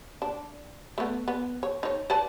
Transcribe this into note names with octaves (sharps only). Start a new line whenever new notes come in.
D4
A3 B3
B3
C#5
D#4 C#5
B4 D5 A5